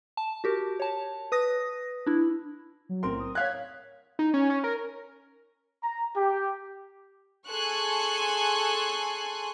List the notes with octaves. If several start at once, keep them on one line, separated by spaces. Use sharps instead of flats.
A5
F#4 G4 A#4
C#5 A5
B4 D#6 A#6
D4 E4
F#3
B1 A2 C4 A#4 C6
D#6
C#5 F5 F#6 G#6 B6
D#4
C#4
C#4
A#4
A#5
G4
G#4 A4 G#5 C6 C#6 F#6